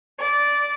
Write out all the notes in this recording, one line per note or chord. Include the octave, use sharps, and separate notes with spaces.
D5